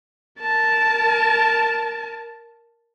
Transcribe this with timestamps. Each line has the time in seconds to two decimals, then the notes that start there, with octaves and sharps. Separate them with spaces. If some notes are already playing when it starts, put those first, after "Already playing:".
0.39 A#4 A5